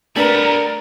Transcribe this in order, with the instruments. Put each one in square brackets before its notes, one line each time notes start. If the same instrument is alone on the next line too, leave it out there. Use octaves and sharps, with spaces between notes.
[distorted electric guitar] G3 B3 [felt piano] A3 D4 B4 [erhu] A#4 [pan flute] D5